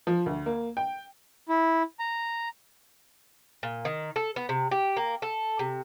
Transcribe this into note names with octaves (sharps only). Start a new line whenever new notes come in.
F3
D2
A#3
G5
E4
A#5
A#2
D#3
A4
B3
C3
G4
A#3
A4
C3